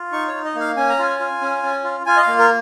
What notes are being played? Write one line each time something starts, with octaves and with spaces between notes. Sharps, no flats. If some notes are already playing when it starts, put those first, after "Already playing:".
Already playing: F4
D#4 C#6
C#5
D#4
D#5
A#3
F5
C#4 G#5
A#5
F4 G#5
F4
C#4
C#4
F4
F4 G#5
D#5
F5
A#3
A#4